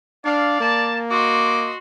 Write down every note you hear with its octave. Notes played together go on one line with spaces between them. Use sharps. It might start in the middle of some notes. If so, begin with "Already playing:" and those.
D4 D5 F5
A#3 A5
F#4 D#5 C6 D6